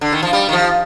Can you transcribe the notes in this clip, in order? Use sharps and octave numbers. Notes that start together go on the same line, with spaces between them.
D3
D#3
F3
G3
D#3
F3